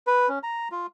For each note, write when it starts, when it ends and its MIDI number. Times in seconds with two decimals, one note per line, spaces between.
0.07 0.29 71
0.29 0.39 61
0.43 0.68 82
0.72 0.87 65